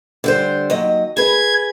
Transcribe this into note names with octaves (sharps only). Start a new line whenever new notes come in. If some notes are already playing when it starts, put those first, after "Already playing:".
D3 G3 C5
D#2 F#3 D#5
G#4 B4 G#6